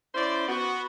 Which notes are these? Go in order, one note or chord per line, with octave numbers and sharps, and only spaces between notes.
C#4 E4 C5 D5
B3 F#4